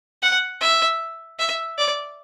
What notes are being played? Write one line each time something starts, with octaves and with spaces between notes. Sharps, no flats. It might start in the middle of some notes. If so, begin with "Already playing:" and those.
F#5
E5
E5
D5